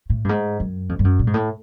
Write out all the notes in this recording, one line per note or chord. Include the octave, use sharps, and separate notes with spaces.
A2
G2
G#2
F#2
F2
G2
F#2
A#2
G#2
A2